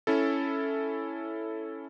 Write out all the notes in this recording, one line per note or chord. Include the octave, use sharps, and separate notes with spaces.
C#4 E4 A4